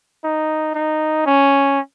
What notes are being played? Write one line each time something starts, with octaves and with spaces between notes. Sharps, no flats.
D#4
D#4
C#4